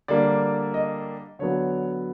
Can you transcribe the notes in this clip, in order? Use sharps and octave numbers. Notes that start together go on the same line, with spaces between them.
D3 G3 A#3 D5
D#5
D3 F#3 B3 C#5